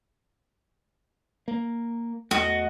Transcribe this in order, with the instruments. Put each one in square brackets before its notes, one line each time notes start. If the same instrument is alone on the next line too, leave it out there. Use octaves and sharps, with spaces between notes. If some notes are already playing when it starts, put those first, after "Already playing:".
[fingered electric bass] A#3
[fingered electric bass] E2 A3 [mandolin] F#4 D#5